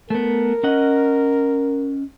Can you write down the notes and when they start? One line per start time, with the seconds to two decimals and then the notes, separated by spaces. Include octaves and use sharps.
0.10 A3 B3 A#4
0.63 C#4 D#5 F#5